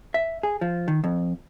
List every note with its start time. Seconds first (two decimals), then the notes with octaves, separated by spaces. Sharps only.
0.14 E5
0.43 G#4
0.61 F3
0.88 D#3
1.04 F2